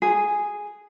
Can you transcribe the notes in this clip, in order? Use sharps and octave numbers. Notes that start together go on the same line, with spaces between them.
G#4